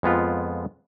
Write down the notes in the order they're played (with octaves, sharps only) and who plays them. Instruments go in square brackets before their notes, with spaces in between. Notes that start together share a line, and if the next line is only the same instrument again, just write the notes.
[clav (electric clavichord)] F2 G#3 B3 F4